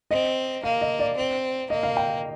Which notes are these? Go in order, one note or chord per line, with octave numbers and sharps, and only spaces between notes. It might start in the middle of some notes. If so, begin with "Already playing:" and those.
C4 D#5
A#3 F5
D#5
D5
C4
A#3 D#5
F5
G5